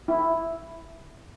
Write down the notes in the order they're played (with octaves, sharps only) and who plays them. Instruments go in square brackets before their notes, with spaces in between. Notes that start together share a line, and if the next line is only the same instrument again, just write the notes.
[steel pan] E4